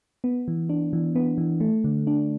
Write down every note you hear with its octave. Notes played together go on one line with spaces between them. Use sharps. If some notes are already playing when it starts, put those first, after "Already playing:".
B3
E3
D4
E3
B3
E3
A3
D3
D4